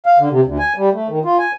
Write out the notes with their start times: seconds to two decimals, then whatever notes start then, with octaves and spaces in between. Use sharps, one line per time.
0.06 F5
0.19 D3
0.31 C3
0.45 D2
0.59 G#5
0.77 G3
0.93 A3
1.08 D#3
1.25 F4
1.39 G#5